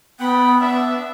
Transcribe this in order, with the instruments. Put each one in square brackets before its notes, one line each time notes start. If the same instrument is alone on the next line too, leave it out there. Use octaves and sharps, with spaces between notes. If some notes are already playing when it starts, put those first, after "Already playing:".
[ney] B3 [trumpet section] F#5 G5 B5
[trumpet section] D4 E5